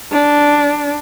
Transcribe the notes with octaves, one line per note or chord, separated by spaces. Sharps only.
D4